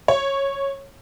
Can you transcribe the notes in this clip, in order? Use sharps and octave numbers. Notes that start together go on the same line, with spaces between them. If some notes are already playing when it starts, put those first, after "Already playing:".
C#5